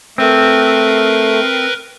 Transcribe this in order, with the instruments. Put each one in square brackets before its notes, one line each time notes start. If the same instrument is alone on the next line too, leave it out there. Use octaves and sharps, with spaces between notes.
[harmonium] A3 [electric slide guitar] C4 [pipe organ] A#4 B4